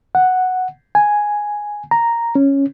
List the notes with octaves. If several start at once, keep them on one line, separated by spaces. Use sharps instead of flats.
F#5
G#5
A#5
C#4